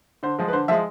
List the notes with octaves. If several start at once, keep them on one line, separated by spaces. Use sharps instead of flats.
D3 C5
F3 G#3
B4
D3 C5
F3 G#3 E5